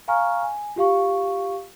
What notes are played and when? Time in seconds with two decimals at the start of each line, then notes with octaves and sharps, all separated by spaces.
0.08 F5 G#5 A#5 C#6 F6
0.43 G#5
0.76 F4 G4 F5 C#6